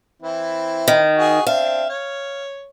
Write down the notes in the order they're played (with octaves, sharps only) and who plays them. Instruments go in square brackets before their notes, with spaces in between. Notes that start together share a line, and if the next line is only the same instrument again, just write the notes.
[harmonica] E3 C4 E4
[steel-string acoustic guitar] D#3
[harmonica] F#4 G#4
[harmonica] C4 D4 E5 [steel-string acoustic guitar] F5
[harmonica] C#5